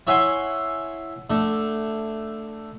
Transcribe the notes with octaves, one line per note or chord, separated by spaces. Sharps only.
E4 C#5 E5 F#5 G#5 C6
D3 A3